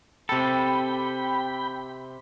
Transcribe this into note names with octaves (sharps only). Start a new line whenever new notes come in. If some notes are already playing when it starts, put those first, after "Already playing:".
C3 A4 G5 B5